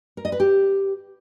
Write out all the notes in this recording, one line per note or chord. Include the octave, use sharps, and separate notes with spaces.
A#4
D#5
B4
G4